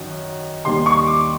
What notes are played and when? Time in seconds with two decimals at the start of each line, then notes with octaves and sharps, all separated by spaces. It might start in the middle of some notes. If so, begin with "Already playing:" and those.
Already playing: F#2 D#3 F#3
0.65 D#2 D#3 G3 C6
0.86 C#6
1.07 D6